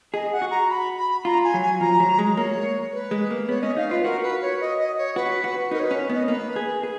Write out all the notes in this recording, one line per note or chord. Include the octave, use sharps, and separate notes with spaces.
G#4 D#5
F#5
F#4
A#5
B5
B5
F4 A#5
G#5
F#3
G#5
F3 A#5
F#3
G#3
A#3 C#5
B4
G#3
A#3
B3 C#5
C#4 D#5
D#4 F5
F4 B4
F#4 A#4
B4
C#5
D#5
D#5
C#5
F#4 B4
F#4
D#4 A#4
C#5
B4
C#4
B3 D#5
A#3 B4
G#4
G#4